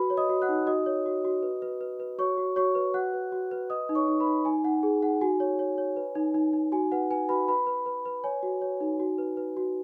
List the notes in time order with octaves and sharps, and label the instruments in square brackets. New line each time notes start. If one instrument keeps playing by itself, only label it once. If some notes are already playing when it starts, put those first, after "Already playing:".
Already playing: [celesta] F#4 B4 B5
C#5
D#5 D#6
F#4
F#5 F#6
D#4
F#4 D#5 D#6
C#5
F#4
F#4
B4
B4
B4
B4
F#4 C#5 C#6
F#4
F#4 C#5 C#6
B4
F#4 F#5 F#6
B4
F#4
B4
B4 D#5 D#6
D#4
C#5 C#6
D#4
B4 B5
D#4
D#4 G#5
D#4 F#5
G#4
D#4 F#5
F#4 G#5
C#5
C#5
C#5
B4
D#4
D#4
D#4
F#4 G#5
B4 F#5
B4 G#5
F#4 B4 B5
B4 B5
B4
B4
B4
C#5 G#5
F#4
C#5
D#4
F#4
B4
B4
F#4